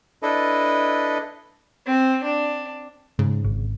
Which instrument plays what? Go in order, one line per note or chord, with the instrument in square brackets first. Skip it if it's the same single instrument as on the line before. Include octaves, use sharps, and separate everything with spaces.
[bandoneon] D4 E4 A4 B4 D#5
[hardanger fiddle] C4
D4
[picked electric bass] G#2 [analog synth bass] C#3
[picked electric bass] G#1